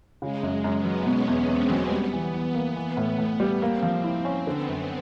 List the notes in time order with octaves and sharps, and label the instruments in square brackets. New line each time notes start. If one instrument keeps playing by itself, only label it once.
[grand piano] C#3 [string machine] G#3
[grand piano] F#2
[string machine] G#3
[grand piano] F#2
[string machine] B3
[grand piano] F#3
[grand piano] B2 [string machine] C#4
[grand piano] E2
[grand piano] E2 [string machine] C4
[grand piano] F#3
[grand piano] G3 [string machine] B3
[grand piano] E3
E3
A#3
E3
A2
A2
G3
[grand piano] A#3 [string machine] C4
[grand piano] F3
[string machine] C4 [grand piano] E4
[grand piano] C#4
[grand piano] D3 [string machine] B3
[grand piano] F#2